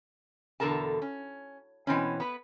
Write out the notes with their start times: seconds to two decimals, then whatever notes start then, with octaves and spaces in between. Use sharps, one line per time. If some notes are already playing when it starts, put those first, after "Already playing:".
0.60 E2 B2 D3 A4 A#4 A5
1.02 C#4
1.87 B2 E3 C4 C#4
2.20 B3 B4